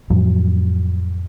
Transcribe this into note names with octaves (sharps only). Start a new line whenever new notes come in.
F2 A2 F3 F#3